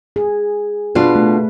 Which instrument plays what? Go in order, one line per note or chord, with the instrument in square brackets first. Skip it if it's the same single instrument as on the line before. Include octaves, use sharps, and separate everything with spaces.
[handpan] G#4
[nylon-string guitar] B2 D4 F4 [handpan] B4
[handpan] A3